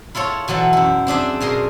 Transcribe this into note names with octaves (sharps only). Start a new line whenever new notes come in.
E4 F4 A4 C#5
B2 E3 F#3 A4
F#2 E4
C4 D4 G#4 E5
B2 G#4 A#4 C6